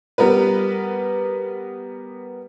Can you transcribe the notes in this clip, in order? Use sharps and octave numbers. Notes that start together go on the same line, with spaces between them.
G3 B3 A#4 B4